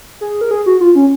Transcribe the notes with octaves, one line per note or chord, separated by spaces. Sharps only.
G#4
A#4
G#4
F#4
F4
C#4